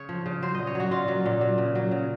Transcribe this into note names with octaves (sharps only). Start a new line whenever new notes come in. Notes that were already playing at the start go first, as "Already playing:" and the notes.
Already playing: C#3 C#5
F3
C#3
F#3 C5
A#2 D#5
C#5
F#3 F#4
A#2 F4
F#3
A#2
F#3
C#3
F#3
C#3